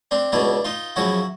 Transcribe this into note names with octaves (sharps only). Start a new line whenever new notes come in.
C4 D4
C#2 B2 D4 E4
D#4 F4
F#2 C#3 F3 E4 F#4